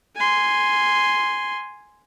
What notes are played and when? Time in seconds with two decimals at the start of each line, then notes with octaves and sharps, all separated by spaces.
0.16 G#5 C6